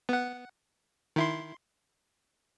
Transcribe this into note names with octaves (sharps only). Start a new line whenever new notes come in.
B3 F#5
D#3 E4 C6